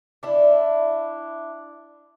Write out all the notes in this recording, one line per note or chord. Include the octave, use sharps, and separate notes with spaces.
D4 E4